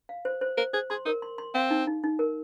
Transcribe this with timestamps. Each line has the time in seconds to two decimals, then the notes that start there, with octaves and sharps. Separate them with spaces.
0.09 F5
0.25 C5
0.41 C5
0.58 A#4 C5
0.73 G#4 C5
0.90 G#4 C6
1.06 D#4 A#4
1.22 C6
1.38 C6
1.54 C4 F5
1.71 D#4
1.87 D#4
2.04 D#4
2.19 A#4